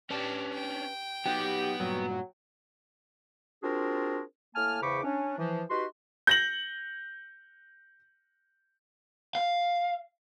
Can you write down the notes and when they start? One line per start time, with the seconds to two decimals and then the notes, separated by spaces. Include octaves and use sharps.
0.11 C#4 D4 G4 B4 A5
0.55 G5
1.26 F#3 B3 D#4 F#4 G4
1.80 G2 A#2 F#3
3.63 C4 D4 F4 F#4 G#4 A#4
4.55 A2 A#3 G#5 A5 F6
4.82 E2 C#3 C5 B5 C#6 D6
5.03 C#4 D4
5.39 E3 F3
5.69 D#4 F#4 G4 B4 C6
6.27 G6 A#6 F#7
9.35 F5